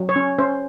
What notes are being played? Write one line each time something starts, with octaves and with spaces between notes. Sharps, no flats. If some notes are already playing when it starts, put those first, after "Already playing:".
Already playing: F#3
C#5
C#4
C#4 C5